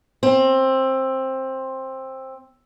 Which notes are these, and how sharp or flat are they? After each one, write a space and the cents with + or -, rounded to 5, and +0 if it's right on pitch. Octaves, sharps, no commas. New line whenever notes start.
C4 +15